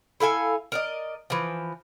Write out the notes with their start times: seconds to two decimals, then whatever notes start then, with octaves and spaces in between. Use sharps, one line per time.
0.20 E4 A4 F5 G#5
0.72 A#4 D5 D#5
1.30 E3 F3